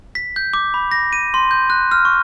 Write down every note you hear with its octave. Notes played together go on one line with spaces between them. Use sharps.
B6
G6
D6
B5
A#6
D#7
C6
G6
F#6
F6
C#6